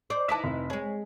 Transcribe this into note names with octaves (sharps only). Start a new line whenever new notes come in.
C5 D5
D#4 E4 B4 A5 D6 B6
F1
G#3 G#4 C#5